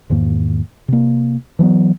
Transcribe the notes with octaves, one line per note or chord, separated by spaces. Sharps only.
E2 G#2 D#3 A#3
C3 A#3
E3 F#3 A#3 B3